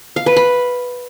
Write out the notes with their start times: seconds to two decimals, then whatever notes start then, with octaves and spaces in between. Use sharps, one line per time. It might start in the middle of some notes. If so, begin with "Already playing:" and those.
0.16 F5
0.26 B4
0.36 B5